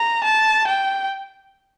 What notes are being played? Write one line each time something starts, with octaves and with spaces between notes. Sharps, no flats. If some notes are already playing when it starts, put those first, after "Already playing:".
Already playing: A#5
A5
G5